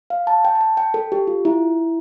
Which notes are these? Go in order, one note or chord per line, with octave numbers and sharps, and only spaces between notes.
F5
A5
G5
A5
G5
G5
A4
G4
F4
E4